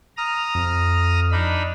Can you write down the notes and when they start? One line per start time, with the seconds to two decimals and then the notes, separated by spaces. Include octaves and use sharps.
0.17 A#5 D#6 F6
0.55 F2
1.32 D4 D#4 B5